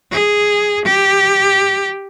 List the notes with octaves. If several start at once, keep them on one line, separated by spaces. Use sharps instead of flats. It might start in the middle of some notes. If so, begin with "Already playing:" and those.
G#4
G4